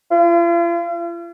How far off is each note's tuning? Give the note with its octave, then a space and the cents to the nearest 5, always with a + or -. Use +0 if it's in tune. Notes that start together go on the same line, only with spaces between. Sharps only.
F4 -40